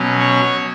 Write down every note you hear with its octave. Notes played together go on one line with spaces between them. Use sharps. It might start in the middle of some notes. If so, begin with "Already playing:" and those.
Already playing: B2 F#3 C#4
C#5